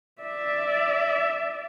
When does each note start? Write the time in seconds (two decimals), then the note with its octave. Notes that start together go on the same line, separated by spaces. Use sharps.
0.22 D5 E5